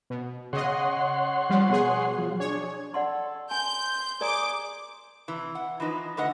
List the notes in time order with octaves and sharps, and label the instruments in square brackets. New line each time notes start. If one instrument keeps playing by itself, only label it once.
[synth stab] B2
[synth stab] C#3 D#5 [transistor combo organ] C#5 F#5 C6
[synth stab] F3 G3
B2 G#4
[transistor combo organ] F3 F#3
[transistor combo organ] D4 G#4 [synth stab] C#5
[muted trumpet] A4 [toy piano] D5 F#5 C6
[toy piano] G#5 [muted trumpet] C6 [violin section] G6
[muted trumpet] G#4 [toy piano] A#4 D5 A#5 [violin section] D6
[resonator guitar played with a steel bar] C3 E3
F#5
E3 F3 D#4 B4
D3 A3 B4 D#5 F#5